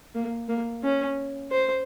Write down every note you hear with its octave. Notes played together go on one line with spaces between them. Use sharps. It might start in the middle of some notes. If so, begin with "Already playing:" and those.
A#3
A#3
C#4
C5